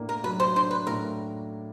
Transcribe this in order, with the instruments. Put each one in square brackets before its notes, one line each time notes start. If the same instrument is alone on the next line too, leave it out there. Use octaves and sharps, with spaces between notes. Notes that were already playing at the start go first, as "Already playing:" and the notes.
Already playing: [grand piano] A2 A#3 D4
[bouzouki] A#4
[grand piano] F#3 [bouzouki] B4
[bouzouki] C5
[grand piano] D4 [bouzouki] C5
[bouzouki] B4
[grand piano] A2 [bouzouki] A#4